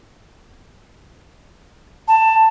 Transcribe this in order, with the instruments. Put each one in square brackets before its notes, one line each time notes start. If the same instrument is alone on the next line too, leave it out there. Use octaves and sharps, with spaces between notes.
[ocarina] A5